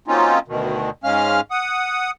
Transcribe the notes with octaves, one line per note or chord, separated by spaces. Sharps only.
F#3 A#3 C4 C#4 D#4 F4
D2 B2 D#3
G#2 G#3 C#4 F5 F6
F#5 D#6